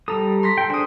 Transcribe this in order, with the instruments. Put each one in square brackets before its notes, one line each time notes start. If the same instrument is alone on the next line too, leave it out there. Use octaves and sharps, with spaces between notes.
[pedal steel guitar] G3 A#5 D#6 [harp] A4
[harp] C6 A#6 B6
[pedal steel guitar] A4 G5
[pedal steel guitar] D4 C5 [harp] G#4 D#6